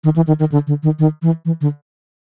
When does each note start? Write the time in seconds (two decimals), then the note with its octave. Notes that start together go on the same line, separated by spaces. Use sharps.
0.04 D#3
0.16 E3
0.27 D#3
0.39 D#3
0.52 D3
0.67 D3
0.83 D#3
0.99 D#3
1.22 E3
1.45 E3
1.61 D3